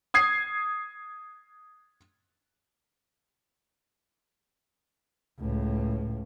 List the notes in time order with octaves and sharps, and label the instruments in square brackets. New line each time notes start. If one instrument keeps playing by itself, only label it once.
[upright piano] D#6 G#6 C7
[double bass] C#2 A2